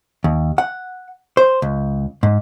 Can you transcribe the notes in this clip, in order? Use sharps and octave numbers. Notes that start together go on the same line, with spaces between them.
D#2
F#5
C5
C#2
G#2